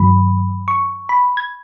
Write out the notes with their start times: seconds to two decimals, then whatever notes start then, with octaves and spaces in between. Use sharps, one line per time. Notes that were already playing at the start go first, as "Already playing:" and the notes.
Already playing: G2 D#3 F#3 B5
0.68 C#6
1.09 B5
1.37 G#6